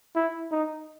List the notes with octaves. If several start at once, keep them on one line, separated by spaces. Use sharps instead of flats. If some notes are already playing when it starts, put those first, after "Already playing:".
E4
D#4